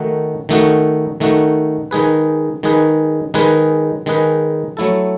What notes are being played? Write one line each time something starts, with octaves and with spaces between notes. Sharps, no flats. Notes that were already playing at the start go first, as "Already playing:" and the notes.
Already playing: D#3 A3 D#4 F#4
D#3 A3 D#4 F#4
D#3 A3 D#4 F#4
D#3 G#3 D#4 G#4 B4
D#3 G#3 D#4 G#4 B4
D#3 G#3 D#4 G#4 B4
D#3 G#3 D#4 G#4 B4
F#3 A3 E4 A4